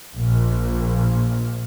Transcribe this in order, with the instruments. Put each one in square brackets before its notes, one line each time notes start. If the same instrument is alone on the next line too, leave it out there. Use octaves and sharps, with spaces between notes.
[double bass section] A#1 A#2